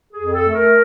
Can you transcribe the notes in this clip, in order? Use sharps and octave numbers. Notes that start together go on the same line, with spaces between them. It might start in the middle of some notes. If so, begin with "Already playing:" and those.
G#4
F2
A4
A3
A#4